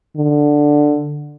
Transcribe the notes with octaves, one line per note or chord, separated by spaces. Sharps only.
D3